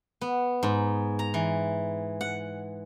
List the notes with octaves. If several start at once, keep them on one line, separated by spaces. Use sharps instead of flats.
B3
G#2
A#5
E3
F#5